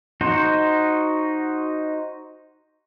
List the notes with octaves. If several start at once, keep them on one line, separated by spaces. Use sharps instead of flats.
D#4 F#4 C5